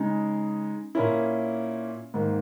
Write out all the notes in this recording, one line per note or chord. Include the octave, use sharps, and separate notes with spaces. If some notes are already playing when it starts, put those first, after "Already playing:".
Already playing: C#3 G#3 D#4
A#2 A#3 C#4 E4
G#2 D#3 A#3